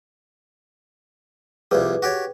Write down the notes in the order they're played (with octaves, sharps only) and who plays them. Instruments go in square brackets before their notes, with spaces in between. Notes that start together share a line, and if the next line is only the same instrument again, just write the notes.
[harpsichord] C2 F2 G3 [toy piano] G#4 B4
[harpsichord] F#4 G4 C#5